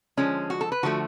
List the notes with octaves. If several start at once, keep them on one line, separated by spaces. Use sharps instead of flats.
D3 F3 G#3 C#4
F#4
A4
B4
D3 F3 A3 F#4